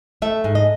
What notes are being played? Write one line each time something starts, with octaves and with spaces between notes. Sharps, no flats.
A3 E5
G#2
D#5